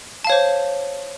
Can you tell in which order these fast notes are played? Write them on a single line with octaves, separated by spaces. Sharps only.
A5 F5 C#5 C5